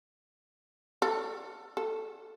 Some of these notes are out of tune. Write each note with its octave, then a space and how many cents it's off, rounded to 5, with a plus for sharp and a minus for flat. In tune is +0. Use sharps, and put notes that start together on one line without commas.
A4 +15
A4 +0